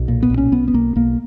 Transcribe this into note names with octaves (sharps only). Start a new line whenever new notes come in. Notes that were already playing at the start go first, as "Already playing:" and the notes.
Already playing: B1
A#2
B3
B1
C#4
B1 B3
B3
B1 A#3
B1 A#3